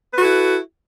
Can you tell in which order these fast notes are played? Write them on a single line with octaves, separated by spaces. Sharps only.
B4 F#4 A4 E4